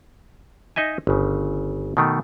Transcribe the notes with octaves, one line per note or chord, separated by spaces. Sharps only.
D#4 D#5 E5 G#5
G1 C#3
B2 D#3 A3